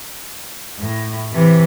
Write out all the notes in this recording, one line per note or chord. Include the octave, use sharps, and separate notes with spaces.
A2
C3 E3